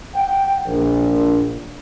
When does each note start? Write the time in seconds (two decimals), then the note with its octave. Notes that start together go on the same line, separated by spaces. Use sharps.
0.15 F#5 G5
0.66 A#1